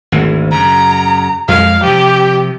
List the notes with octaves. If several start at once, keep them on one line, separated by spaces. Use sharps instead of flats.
G#1 D2
F#2 C#3 A#5
F2 G#3 F5
C3 F3 G4